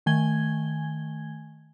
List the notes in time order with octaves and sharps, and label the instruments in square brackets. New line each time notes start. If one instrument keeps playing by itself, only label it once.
[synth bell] D#3 A3 G#5 G#6 G7